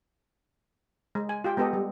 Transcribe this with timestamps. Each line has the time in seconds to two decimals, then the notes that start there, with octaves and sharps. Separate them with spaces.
1.15 G#3
1.29 G#5
1.44 F4 G4 G5
1.57 G#3 B3 G4 A4 D#5
1.73 G3